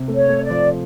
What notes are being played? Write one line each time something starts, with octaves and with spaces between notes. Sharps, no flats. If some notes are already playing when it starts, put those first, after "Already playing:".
Already playing: C3
A3
C#5
A3
D5
F3